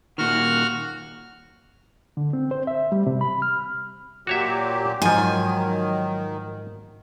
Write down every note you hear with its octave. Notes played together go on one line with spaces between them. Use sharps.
A#2 D#3 F#4 F6
D3
C4
C5
E5
G3
C3
B5
F6
A#2 F#3 F#4 G4 C#5 E5
G#2 D#3 F3 F#3 G#5